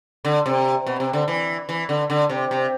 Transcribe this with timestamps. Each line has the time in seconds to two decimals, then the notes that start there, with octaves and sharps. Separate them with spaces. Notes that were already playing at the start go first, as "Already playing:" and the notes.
0.25 D3
0.46 C3
0.87 B2
1.00 C3
1.13 D3
1.28 E3
1.69 E3
1.89 D3
2.10 D3
2.30 C3
2.51 C3